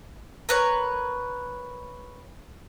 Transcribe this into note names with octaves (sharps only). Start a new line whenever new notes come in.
A#4 B4 C#5